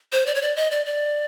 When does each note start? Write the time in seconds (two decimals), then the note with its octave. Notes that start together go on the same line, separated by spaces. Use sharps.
0.13 C5
0.27 D5
0.35 C#5
0.42 D5
0.56 D#5
0.71 D5
0.86 D5